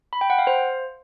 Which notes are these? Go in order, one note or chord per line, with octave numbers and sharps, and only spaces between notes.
B5
G5
F#5
F5
C5